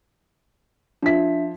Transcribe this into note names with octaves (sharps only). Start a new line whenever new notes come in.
F3 D4 E5 B6